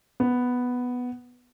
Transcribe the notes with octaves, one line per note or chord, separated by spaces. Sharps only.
B3